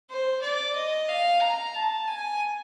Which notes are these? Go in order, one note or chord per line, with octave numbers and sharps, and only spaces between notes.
C5
D5
D#5
F5
A#5
A5
G#5